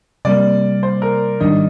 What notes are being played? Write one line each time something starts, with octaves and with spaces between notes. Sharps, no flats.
C3 G3 A#3 D5
C5
A#4
G#2 D#3 G3 D4 D#4